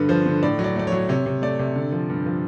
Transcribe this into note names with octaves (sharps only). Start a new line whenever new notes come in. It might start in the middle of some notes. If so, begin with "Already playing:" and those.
Already playing: G2 D3 B4
F3 C5
D3
A2 D5
F#3
D5
A3 D5
F#3 C#5
C3 C#5
C3
A3 D5
C3
D3
F3
G2
F3